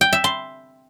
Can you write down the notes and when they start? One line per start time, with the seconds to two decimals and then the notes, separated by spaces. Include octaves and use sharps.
0.01 G5
0.13 E5
0.24 C6